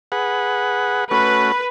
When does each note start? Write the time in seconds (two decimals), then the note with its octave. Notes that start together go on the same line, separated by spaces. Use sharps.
0.12 G#4 B4 F#5
1.11 A3 C#4 F#4 B4